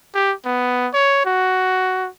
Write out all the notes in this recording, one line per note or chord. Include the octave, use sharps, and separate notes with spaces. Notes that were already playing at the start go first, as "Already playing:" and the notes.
G4
B3
C#5
F#4